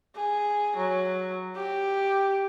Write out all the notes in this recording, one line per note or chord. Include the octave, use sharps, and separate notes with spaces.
G#4
F#3
G4